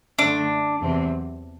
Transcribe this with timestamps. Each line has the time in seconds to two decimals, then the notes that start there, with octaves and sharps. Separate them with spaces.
0.18 F#2 D3 A3 D4
0.81 E2 C3 F#3 C4